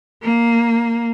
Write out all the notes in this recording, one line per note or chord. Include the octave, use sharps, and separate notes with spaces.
A#3